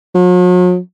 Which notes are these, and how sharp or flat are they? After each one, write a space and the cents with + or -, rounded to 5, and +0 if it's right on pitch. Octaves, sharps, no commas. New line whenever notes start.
F#3 -45